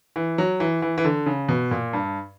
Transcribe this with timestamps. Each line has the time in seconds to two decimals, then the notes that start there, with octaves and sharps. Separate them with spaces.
0.16 E3
0.38 F#3
0.60 E3
0.82 E3
0.98 E3
1.05 D3
1.26 C#3
1.49 B2
1.71 A#2
1.93 G2